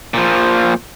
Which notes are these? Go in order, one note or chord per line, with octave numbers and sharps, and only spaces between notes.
A#2 F3